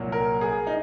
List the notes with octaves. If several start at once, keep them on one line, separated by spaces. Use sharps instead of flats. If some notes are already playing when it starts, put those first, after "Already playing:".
Already playing: C2 A#2 F#3
A#4
G#4
D#4